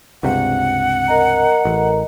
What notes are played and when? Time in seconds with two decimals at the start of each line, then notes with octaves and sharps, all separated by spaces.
0.23 C#2 G2 C3 F#5
1.08 A#4 D#5 A#5
1.65 A1